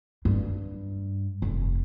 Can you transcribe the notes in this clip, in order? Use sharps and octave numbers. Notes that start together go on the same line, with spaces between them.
G2
F1